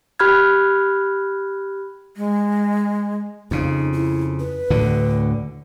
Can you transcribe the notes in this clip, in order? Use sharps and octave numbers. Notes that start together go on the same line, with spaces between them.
G4 B5 F6 F#6 G#6
G#3
F2 C#3 D#4
E4
B4
D2 A2 D3